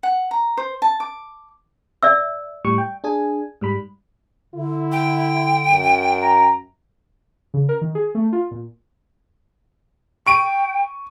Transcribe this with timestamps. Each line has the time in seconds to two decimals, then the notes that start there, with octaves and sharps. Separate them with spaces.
0.03 F#5
0.31 A#5
0.57 C5
0.82 A5
1.00 D6
2.03 D5 E5 E6
2.65 A2 G3 C#6
2.78 G5
3.04 D4 G#4 G#5
3.61 G#2 G3 B5
4.54 D3 E4
4.92 G5
5.69 F#2
6.22 A#5
7.54 C#3
7.69 A#4
7.81 D#3
7.95 G#4
8.15 A3
8.33 F4
8.51 A#2
10.26 G5 C#6 D7 D#7